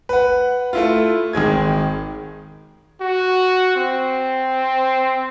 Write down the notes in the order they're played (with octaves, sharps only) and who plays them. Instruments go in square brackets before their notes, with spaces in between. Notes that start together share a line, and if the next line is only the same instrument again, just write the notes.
[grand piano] B4 F#5
A3 E4 F4
G#1 D#3 G#3 G#6
[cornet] F#4
C4